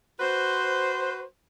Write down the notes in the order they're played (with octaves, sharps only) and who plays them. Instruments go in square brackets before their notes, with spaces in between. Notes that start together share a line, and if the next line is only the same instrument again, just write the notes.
[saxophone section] F#4 B4 C5